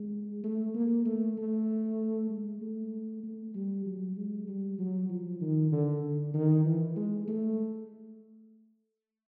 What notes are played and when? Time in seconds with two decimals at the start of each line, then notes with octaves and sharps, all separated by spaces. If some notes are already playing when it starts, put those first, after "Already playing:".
Already playing: G#3
0.44 A3
0.74 A#3
1.05 A3
1.37 A3
2.29 G#3
2.61 A3
3.23 A3
3.54 G3
3.86 F#3
4.16 G#3
4.47 G3
4.78 F#3
5.09 F3
5.41 D#3
5.71 D3
6.03 D3
6.34 D#3
6.65 E3
6.96 G#3
7.27 A3